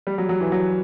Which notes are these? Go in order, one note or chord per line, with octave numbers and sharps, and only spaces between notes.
G3
F#3
F#3
E3
F#3